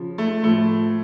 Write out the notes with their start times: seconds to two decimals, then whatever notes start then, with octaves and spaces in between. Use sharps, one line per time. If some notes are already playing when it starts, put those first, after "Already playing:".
Already playing: C#3 F3
0.18 A3
0.44 A2 F3 A3